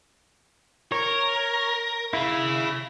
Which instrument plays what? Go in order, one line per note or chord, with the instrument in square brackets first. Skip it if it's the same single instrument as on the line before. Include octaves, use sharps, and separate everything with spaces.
[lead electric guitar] A#4 [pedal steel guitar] C#5
[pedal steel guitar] E4 [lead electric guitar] G#4 F5